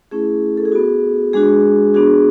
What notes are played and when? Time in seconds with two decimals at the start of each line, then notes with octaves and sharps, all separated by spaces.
0.11 A3 C#4 E4 G#4
0.57 A4
0.65 G#4
0.72 B3 F#4
1.33 G#3 D4 F#4 G#4
1.94 B3 D4 F#4 G#4